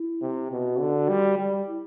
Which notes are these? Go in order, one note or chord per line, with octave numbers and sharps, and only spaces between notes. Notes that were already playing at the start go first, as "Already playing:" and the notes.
Already playing: E4
C3
B2 F#4
D3
G3
G3
E4